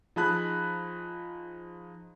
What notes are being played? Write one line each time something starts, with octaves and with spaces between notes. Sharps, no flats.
F3 D#4 G#4 A5 B5 F#6